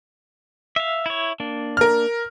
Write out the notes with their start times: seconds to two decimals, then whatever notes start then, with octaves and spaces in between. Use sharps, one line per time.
0.76 E5 F5
1.06 E4 C#5
1.40 A#3 D4
1.77 A#4 F6